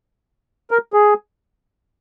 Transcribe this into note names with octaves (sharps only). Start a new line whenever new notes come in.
A#4
G#4